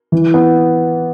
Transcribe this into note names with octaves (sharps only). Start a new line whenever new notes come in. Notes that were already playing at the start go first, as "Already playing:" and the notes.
E3
B3